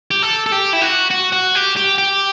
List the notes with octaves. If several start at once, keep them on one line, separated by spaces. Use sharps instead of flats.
G4
A4
A4
G4
E4
F#4
F#4
F#4
G4
G4
G4